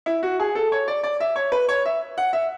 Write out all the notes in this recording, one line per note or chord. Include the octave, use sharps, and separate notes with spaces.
E4
F#4
G#4
A4
C#5
D5
D5
E5
C#5
B4
C#5
E5
F#5
E5